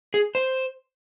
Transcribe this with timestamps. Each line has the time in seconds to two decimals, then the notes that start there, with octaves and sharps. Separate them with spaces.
0.14 G#4
0.35 C5